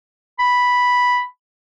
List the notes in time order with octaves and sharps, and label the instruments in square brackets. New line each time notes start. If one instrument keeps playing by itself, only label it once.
[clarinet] B5